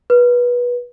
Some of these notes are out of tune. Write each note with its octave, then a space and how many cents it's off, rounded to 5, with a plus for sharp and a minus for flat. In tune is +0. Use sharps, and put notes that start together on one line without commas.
B4 -20